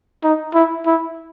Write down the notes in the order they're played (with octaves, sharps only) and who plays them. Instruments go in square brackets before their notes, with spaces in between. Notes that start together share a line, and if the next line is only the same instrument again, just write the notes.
[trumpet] D#4
E4
E4